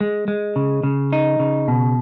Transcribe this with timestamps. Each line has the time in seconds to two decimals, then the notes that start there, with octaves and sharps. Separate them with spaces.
0.01 G#3
0.28 G#3
0.56 C#3
0.83 C#3
1.12 D#4
1.40 C#3
1.68 B2